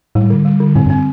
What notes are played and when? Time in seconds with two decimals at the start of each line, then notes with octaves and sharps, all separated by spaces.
0.15 A2 G3
0.30 D3
0.45 G3
0.60 D3
0.75 A2 C4
0.86 G2
0.90 C4